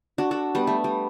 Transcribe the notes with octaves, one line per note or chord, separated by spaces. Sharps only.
D4 F#4
F#4 A4
G3 B3
A3
G3